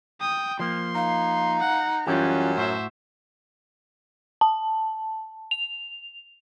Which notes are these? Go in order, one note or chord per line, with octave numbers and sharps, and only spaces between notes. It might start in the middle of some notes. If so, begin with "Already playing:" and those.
G5 D#6
F3 A#3 C6
D#4 F5
F#5
F#2 E3 G3 C#4 F4 G4 C#5
A2 F#4 C5 E5
A5
F7